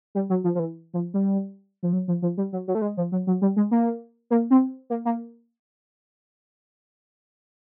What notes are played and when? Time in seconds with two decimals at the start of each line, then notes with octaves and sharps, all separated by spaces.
0.15 G3
0.30 F#3
0.44 F3
0.55 F3
0.59 E3
0.94 F3
1.14 G3
1.83 F3
1.93 F#3
2.08 F3
2.22 F3
2.37 G3
2.53 F#3
2.68 F#3
2.75 A3
2.82 G#3
2.97 F3
3.12 F#3
3.27 F#3
3.42 G3
3.56 G#3
3.71 A#3
4.30 A#3
4.50 C4
4.90 A#3
5.05 A#3